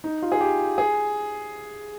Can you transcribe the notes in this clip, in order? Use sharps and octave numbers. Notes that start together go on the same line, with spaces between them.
D#4
F4
G#4
G4
G#4